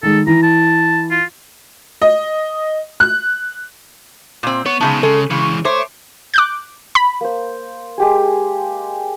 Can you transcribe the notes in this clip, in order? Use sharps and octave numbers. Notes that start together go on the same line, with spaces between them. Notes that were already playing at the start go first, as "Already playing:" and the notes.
D#3 G#3 A4
E3 A#5
A5
F4
D#5
F#6
A#2 C4
B3 C#5
A2 C#3 G#3 B3 D#4 A5
C#3 G#3 A4
C#3 E3 G#3 C#6
A3 C5 C#5 D6
D6 F#6 G6
B5
A#3 C5
G#3 G4 G#4